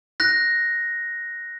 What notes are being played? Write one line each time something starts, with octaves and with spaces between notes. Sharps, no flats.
F#6 A#6